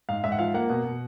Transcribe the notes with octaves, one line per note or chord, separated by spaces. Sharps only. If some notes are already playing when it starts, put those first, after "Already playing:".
G#2 F5
G#2 E5
F#5
F3 F5
A#3 F#5
B2
B2